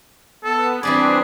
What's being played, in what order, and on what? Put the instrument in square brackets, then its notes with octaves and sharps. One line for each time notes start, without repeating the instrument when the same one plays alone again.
[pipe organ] B3 [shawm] A4
[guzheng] E3 G3 D5 [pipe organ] C4 D4 [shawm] G#4